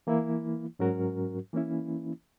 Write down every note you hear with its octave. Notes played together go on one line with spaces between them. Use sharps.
E3 A#3 E4
G#2 F#3 C#4 F#4 A#4
E3 A#3 C#4 E4